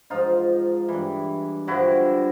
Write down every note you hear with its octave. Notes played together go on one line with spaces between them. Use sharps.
G#2 F3 D#4 F4
G2 E3
G2 D3 F3 E4 F#4